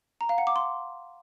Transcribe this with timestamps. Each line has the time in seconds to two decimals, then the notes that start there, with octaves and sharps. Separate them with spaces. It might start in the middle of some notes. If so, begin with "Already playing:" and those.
0.21 A#5
0.29 F5
0.38 F#5
0.47 D6
0.56 C6